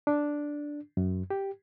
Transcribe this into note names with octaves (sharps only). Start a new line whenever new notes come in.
D4
F#2
G4